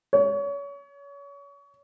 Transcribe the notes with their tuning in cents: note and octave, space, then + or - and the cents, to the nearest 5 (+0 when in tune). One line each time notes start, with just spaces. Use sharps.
C#5 +30